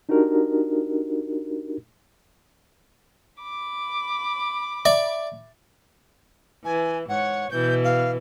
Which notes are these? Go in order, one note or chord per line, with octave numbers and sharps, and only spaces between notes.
D4 D#4 F#4 G4 A#4
B5 D6
D5 E5
E3 G#5
G#2 C#5 F#5
B2 E3 G6
F5